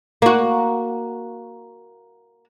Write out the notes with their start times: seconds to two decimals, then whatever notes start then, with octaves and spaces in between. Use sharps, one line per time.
0.22 A#3 F#4